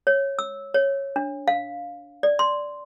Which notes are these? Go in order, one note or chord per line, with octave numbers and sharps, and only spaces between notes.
C#5
E6
C#5
D4
F5
D5
C6